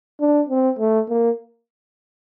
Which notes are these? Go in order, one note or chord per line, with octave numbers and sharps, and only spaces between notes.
D4
C4
A3
A#3